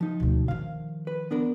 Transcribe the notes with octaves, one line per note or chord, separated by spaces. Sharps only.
F3 D#4
D2 B2
D#3 F3 F5
B4
B3 D4 A#4